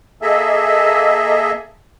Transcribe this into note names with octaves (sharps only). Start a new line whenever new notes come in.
A#3 G#4 A4 D#5 E5